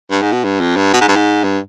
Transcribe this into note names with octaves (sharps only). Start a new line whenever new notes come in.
G2
G#2
B2
G2
F2
G2
B2
G#2
G2
G#2
G2